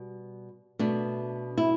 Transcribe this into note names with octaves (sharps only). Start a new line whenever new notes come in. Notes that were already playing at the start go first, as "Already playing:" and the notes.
Already playing: B2 G3
B2 A3 D4
E4